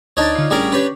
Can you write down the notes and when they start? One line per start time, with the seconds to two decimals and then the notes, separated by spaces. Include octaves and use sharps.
0.17 D2 D4 D#4 C#5 A6
0.35 D3 F4
0.51 A1 G3 C#4 D4 G#4 A#4
0.72 C#4 D4 G4 B4 C#5